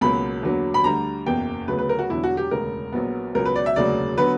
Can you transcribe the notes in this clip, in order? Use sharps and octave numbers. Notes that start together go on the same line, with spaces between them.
C#2 B2 F#3 A#3 B5
E2 D3 F#3 A#3
B5
D2 D3 G3 A#5
F#1 E2 B2 A#3 G5
D2 C#3 F#3 B3 B4
B4
A#4
F#4
E1 E2 D3 F#3 E4
F#4
G4
E1 D2 C#3 A#4
A#1 A#2 F#3 B3
C#2 B2 F#3 A#4
B4
D5
E5
E1 D2 C#3 F#3 A#3 D5
D3 F#3 B3 B4